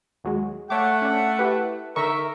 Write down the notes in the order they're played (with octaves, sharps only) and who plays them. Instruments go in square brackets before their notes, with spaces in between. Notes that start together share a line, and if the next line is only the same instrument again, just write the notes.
[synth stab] D#2 F#3 G#3
[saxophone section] A3 [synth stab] C#5 D6 [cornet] F#5
[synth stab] C#4 D4
E4 G4 B4
[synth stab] D3 C#6 [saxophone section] D#4 E5 [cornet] A#4